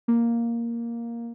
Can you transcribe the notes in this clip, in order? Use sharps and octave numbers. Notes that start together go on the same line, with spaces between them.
A#3